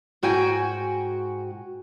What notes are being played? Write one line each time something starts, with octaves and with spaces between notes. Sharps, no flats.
G#2 F#4 G5 G#5